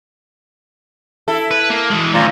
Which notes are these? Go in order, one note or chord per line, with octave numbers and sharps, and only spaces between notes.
E4 A4
B4
A#3
E3 G#3
D#2 A2 C4 C#4 F4 D5 A#5